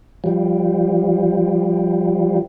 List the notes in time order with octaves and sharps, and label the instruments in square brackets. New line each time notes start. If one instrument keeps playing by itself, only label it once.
[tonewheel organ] F3 G3